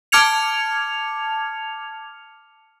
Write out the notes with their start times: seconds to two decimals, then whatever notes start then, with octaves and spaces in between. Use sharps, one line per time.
0.12 A5 D6 F6 G#6 C#7 F7